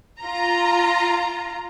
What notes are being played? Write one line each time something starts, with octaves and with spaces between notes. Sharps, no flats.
F4 A#5